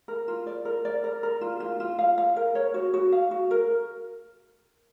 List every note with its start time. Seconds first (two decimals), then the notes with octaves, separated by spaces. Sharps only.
0.08 A#4
0.28 F4
0.46 D5
0.65 A#4
0.85 D5
1.04 A#4
1.23 A#4
1.41 F4
1.60 F4
1.80 F4
1.99 F5
2.18 F5
2.36 A#4
2.55 C#5
2.74 F#4
2.94 F#4
3.12 F5
3.31 F#4
3.51 A#4